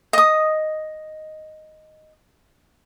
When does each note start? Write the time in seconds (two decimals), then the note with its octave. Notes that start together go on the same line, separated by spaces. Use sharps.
0.13 D#5 D#6